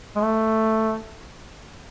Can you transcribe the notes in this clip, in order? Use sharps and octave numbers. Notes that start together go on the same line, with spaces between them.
G#3
A3